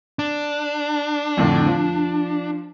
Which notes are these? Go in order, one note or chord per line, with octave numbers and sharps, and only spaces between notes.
D4
F2 A2 D3
F3